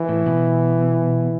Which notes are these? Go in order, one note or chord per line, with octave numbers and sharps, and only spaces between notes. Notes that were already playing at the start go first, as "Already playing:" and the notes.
Already playing: E3
A2
B2